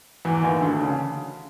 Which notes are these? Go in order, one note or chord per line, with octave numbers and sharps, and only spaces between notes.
E2 E3
D#2 D#3
D2 D3
C#3